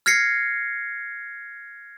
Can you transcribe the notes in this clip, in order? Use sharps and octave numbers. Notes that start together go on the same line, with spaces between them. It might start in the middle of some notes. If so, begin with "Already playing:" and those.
F6 G#6 A#6 C7 C#7